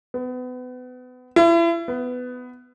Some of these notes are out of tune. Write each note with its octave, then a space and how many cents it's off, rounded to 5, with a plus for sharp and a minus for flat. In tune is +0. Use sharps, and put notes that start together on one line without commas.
B3 +30
E4 +35
B3 +15